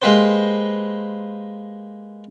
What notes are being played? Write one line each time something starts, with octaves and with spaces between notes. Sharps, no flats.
G#3 A#3 G4 B4 C5